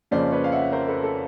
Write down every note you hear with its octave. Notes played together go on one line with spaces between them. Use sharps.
F2 C#3 F3 A#3 C#4 C5 D5
B4 C#5
F5
E5 F#5
A#4 C5
A4 B4
A4